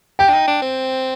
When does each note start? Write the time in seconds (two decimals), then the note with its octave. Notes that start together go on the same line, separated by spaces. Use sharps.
0.19 G4 G5
0.29 D4
0.34 D#4
0.48 D4
0.62 C4